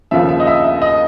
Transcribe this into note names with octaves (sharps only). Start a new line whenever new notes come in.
D#2 C#3 F3 E5
E5
D#5
E5
E5
D#5